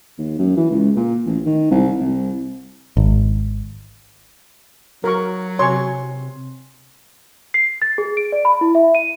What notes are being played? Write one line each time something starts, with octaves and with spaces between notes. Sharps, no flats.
D#2
F#2
E3
C#2
A#2
A1
D#3
C2
C2
G#1
F#3 A#4 C#6
C3 C#5 G#5 C6
C7
A6
G#4
D7
D5
B5
E4
E5
D#7